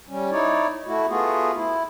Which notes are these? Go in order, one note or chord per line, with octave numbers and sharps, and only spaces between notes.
G3 C#4
D#4 E4 C#5 D5
A3 E4 F#4
A3 B3 F4 F#4 G#4
E4